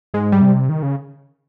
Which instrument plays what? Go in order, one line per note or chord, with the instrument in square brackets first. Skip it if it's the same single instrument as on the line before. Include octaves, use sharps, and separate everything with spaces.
[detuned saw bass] G#2 [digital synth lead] G#3
[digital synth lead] G3
[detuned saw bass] C3
D#3
C#3